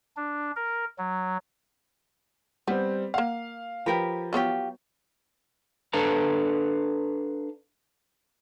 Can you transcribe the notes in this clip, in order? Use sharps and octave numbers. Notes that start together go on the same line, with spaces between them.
D4
A#4
F#3
G3 B3 C4
A#3 F5 F#5
F3 G4 A#4 B4
F#3 B3 F4 G4 C#5
D4 A4 B4 F5 A#5